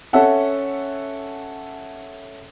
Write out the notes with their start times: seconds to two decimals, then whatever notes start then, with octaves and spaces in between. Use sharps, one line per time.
0.13 C#4 A4 E5 F#5